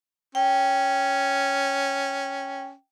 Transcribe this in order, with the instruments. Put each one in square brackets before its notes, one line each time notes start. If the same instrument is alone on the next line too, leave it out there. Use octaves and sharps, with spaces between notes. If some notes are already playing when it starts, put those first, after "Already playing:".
[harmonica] C#4 [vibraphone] G5